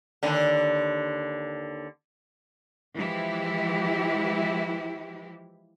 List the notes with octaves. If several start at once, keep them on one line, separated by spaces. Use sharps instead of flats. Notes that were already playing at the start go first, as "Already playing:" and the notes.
D#2 D3
E3 F3 G#3 E4 G4